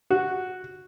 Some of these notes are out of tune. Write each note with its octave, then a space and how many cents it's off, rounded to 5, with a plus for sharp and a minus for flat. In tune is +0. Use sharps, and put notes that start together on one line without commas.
F#4 -5